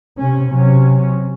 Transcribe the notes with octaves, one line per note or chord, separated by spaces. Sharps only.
C3 C#4
C3 F#3 C#4